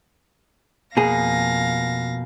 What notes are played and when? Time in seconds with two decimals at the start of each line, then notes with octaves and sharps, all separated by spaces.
0.97 F2 B2 A#3 G#4 F5 A#6